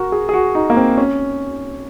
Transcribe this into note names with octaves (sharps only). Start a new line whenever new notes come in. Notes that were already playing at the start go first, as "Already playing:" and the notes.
Already playing: F#4 A#4
G#4
G#4
F#4
D#4
A#3
C4
C#4